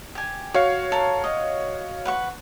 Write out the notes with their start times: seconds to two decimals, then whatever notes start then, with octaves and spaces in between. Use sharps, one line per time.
0.15 G4 G#5
0.54 F#4 C#5 F5 C#6
0.92 A4 A#4
1.24 D#5
2.05 B4 F#5 C#6